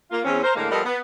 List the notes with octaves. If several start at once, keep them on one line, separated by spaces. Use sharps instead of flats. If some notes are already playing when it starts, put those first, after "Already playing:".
A#3 F4
E2 C4 C#4
A#4 C5
A2 D3 G#3 A#3
F3 G3 B3 A4 A#4 D#5
B3